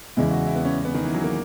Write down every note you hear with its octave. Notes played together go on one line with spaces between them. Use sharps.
E2 C#3 G#3 E4
F#4
E4
B3
C#4
B3
D#3
E3
F#3
A#3